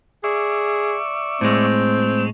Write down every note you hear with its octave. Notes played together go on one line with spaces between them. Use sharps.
G#4 D5 E5 C#6
A2 G#3 C4